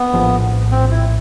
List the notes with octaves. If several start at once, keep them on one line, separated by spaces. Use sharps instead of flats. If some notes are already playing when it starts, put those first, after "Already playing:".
Already playing: B3
A#1 A2 F3
C4
E4